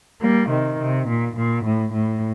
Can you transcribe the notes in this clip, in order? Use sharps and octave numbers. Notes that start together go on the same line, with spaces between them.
G3 A#3
C3 D#3
C3
A#2
A#2
A2
A2